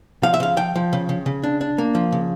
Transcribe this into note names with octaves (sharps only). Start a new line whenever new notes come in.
F3 F5
E5
C#3 F5
F3 G5
F3
C#3
C#3
C#3
D4
D4
A#3
F3
C#3